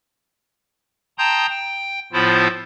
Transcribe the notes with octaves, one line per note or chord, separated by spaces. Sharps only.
G5 A5 A#5 C6 D#6 G6
G5
A2 F3 B3 E4 F4 C5